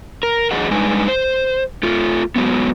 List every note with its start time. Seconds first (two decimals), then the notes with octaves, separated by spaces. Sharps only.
0.23 A#4
0.51 E2 F#3 G#4 D#5 F#5
0.71 G3 G#3 D4 D#4 B4 G#5
1.08 C5
1.83 A3 F4
2.36 G#2 F#3 G#3 B3